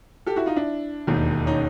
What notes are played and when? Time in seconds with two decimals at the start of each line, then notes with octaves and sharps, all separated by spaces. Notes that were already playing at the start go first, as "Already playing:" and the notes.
0.26 G4 A4
0.36 E4 F#4
0.46 D#4 F4
0.56 D4 E4
1.07 E1 D#2 D#3
1.46 C#4 D#4